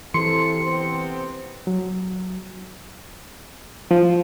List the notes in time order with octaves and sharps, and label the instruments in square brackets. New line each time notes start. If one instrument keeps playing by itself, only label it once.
[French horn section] C3 A4 [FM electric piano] E3 C6 C#7
[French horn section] C3 B3 C4
[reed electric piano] F#3
[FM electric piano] F3